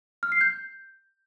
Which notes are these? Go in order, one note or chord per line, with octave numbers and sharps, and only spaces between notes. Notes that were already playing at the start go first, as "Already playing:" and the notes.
F6
C7
G6